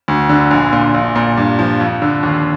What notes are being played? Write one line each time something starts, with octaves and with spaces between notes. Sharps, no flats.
D2
D3
A#1
A#2
A#1
A#2
G2
F3
F2
D3
D#2